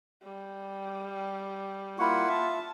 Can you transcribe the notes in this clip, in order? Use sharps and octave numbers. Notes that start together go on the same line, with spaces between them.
G3
A#3 E4 F4 F#5 B5 C#6
E5 A5